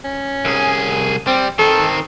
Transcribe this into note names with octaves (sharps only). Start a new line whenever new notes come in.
C#4
C2 G#4
G3 C4
D#3 C4 A4